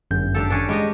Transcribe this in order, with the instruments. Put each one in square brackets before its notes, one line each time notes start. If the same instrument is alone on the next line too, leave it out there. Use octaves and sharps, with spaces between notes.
[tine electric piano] G1 F#2 G6
[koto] D4 G4 A4
C#4 D4
[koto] G3 G4 D#5 [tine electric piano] G#3